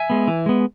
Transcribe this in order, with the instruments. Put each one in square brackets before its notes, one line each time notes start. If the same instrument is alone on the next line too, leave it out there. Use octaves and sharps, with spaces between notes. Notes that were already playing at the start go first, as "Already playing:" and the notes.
Already playing: [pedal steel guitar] E5 G#5
G#3 B3
E3
G#3 B3